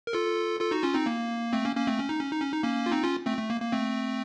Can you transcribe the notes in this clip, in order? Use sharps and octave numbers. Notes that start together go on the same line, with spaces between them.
A#4
F4 A4
F4 A4
D#4 F#4
C#4 F4
C4 D#4
A#3
A3 C4
A#3 C#4
A#3 C#4
A3 C4
C#4
D#4
C#4
D#4
C#4
D#4
A#3 C#4
F4
C4 D#4
C#4 F4
A3 C4
A3
A#3
A#3
A3 C4